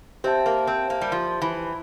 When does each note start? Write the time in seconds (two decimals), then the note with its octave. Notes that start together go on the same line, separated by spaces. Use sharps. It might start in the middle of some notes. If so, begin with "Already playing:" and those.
0.24 C4 G4 C5 E5 A5
0.46 A#3
0.67 C4
0.90 A#3
1.01 G3
1.12 F3
1.42 E3